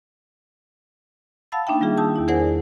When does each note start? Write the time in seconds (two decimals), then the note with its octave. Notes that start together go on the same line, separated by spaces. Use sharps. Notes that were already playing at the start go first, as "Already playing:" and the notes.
1.52 F5 F#5 A5 B5 E6 A6
1.67 A#3 D4 D#4 E5 G5
1.80 D#3 G3 F4 G#4
1.97 A5 D#6 E6 G6
2.16 E2 E4
2.28 G#4 A#4 C5 D5 F#5 G#5